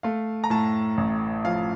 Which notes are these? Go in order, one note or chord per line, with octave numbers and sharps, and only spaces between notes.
A3 F5
A#5
A2 A5
A1
F3 F5